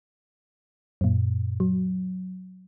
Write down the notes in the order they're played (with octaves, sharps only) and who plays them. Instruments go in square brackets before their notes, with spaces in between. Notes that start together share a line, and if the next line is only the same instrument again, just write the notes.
[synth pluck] F#2 A#2
F#3